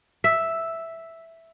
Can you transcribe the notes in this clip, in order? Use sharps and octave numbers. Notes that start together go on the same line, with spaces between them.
E5